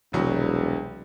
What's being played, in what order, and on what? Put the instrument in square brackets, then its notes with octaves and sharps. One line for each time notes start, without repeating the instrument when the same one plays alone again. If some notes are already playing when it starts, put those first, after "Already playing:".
[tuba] E1 [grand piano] C2 F#3 G3